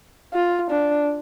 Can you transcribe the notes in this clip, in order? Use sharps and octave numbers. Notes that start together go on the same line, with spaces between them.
F4
D4